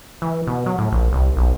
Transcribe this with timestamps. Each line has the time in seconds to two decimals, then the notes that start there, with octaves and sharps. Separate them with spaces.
0.22 E3
0.47 B2
0.66 F#3
0.78 A2
0.92 A#1
1.13 C2
1.37 B1